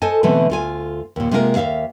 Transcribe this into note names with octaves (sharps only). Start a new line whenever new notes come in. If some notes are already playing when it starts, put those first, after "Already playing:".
A4 C5 D#5 G#5 A5
B2 D3 E3 A3 C4 C#4
D2 F4 G#5
D#2 A#2
C3 G#3 A#3 F4 G#4 A#4
D#2 D#3 E5 F5